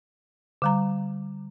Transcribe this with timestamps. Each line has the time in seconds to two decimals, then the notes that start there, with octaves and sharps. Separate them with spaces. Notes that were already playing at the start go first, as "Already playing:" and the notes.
0.62 D3 G3 A#5